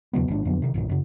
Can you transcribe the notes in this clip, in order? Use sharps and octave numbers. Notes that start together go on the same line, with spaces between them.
E2 C#3 F#3 B3
A1 G#2 D#3 D4
F2 D3 F#3 B3
C3 D#3
B1 G2 A#2 D#3
F#2 C#3